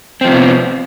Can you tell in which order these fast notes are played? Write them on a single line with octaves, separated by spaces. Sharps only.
C4 F3 C3 B3